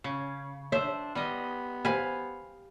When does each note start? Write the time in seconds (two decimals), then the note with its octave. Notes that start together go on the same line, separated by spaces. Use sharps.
0.04 C#3 C#4
0.72 D4 C5 C#5 E5
1.15 G3 B3 D#5
1.85 G4 C5 F5 G#5 B5